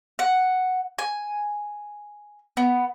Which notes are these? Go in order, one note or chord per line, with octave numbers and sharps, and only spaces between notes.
F#5
G#5
B3